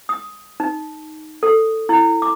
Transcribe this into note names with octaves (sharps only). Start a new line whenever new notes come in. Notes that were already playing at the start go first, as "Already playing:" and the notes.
D#6
D#4
A4
E4
D6